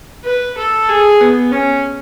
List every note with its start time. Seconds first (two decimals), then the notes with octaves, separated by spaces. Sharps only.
0.25 B4
0.58 A4
0.89 G#4
1.21 B3
1.52 C#4